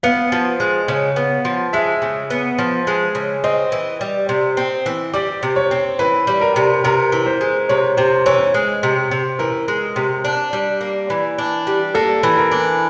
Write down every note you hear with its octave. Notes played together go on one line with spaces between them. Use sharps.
B3 F5
F3
G#3
C#3
B3
F3
G#3 E5
C#3
B3
F3
G#3
C#3
C4 D#5
E3
G3
C3
C4
E3
G3 D5
C3
C#5
C4
E3 B4
G3
A#4
C3
C3 A#4
E3
C5
G#3
C3 C#5
C3 C5
E3 C#5
G#3
C3
C3
E3 A#4
G#3
C3
D4
G3
A#3
E3
D4
G3
A#3 A4
E3
A#4
D4